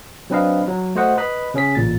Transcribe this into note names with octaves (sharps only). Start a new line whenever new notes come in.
F#3 C4 D4 B4 D#5 F5
F#3
A3 F#4 C5 D#5 F#5
B4 D#5 B5
C#3 C#4 G#4 B6
A1 A#2 A6